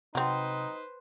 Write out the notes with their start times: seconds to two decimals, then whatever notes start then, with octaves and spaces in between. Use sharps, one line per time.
0.15 C3 F#3 C4 D#4 B4 C5